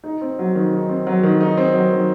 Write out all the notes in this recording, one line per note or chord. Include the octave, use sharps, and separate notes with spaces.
D#4
C4
F#3
D#3
D#4
C4
F#3
D#3
D#4
C4
F#3
D#3